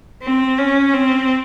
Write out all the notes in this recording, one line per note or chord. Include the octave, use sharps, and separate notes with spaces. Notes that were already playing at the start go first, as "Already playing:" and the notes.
C4
C#4
C4